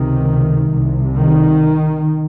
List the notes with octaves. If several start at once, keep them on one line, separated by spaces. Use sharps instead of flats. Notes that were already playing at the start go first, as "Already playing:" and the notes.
Already playing: C#2 C3 D#3
C2 C3
D#3